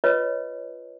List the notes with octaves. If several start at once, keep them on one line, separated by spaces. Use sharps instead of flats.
F4 B4 C#5 D#5